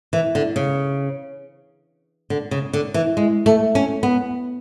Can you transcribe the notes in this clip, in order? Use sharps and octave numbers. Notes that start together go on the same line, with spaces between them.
E3
D3
C#3
D3
C#3
D3
E3
G#3
A3
C#4
B3